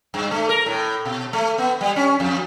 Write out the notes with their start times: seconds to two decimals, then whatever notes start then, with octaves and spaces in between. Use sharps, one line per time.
0.14 G2
0.31 A3
0.49 A#4
0.66 A2
1.05 B2
1.33 A3
1.58 B3
1.81 G3
1.96 C#4
2.20 F2